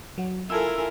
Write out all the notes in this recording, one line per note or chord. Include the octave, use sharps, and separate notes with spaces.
F#3 F#4
E4 F4 A4 A#4 G#5 E6